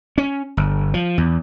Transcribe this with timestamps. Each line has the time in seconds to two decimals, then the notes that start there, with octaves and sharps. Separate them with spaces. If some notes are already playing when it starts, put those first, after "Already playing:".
0.18 C#4
0.57 G1
0.94 F3
1.18 E2